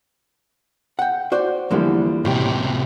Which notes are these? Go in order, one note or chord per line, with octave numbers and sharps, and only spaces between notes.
F#5 G5
F#4 C5 D5
E2 D3 E3 F3 G3 A#3
C#2 A2 C3 G4